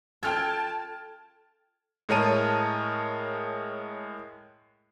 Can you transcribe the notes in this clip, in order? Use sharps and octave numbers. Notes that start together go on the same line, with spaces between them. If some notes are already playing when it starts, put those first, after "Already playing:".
F4 A4 G5 A5 F6 G#6
A2 G#3 A#4 C#5 A5 D#7